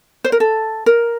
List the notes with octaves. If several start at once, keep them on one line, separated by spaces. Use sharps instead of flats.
C5
A#4
A4
A#4